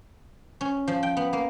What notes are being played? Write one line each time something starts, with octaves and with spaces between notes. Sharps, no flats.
C#4
F3
G5
B3
A#3